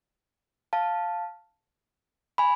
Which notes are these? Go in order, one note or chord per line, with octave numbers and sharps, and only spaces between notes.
F5 A5
G#5 B5